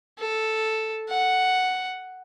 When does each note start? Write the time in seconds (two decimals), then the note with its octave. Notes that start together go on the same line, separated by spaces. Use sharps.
0.18 A4
1.09 F#5